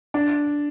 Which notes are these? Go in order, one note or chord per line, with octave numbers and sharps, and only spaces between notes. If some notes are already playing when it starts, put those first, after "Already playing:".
D4